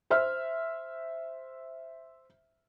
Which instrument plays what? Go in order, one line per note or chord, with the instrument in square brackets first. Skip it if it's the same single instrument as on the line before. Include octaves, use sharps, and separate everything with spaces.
[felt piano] C5 E5 F6